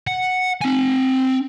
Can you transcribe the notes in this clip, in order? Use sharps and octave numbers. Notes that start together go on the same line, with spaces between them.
F#5
C4 G#5